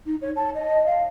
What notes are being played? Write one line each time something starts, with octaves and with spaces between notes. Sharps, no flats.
D#4
C#5
A5
D#5
F5